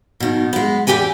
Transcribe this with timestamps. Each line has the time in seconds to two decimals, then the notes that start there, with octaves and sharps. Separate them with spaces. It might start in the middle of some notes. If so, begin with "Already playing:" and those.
0.20 B2 D#3
0.53 G#3 B3
0.87 E2 G#3 G4 G5 G#5